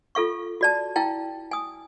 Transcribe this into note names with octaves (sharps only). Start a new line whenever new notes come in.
F4 A4 F5 C#6
F#4 D5 A5
E4 F5 G5 A5
G#5 D#6